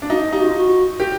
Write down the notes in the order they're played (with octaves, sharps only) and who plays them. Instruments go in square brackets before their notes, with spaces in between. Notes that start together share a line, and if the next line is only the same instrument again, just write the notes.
[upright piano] D4
[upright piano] D#4 [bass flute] F#4
[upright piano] D#4 [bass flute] G4
[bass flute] F#4
F4
F#4
[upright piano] G4